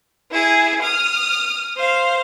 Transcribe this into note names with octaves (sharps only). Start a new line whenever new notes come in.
E4 G#4
D#6 F6
C5 F5